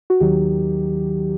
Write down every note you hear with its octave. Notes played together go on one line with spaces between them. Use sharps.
F#4
D#2 D#3 F#3 G4